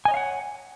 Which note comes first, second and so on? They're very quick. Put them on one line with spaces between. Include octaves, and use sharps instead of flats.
G#5 D#5 C#5 F5 F#5